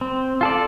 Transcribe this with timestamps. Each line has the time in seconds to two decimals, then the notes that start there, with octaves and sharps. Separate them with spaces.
0.01 C4
0.41 F4 A4 D5